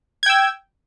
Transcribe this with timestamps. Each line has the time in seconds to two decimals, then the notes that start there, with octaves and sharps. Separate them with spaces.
0.23 G#6
0.26 G5
0.30 E6